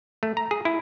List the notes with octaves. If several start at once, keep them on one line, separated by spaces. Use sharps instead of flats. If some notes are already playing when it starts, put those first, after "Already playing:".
A3
A#5
G#4
E4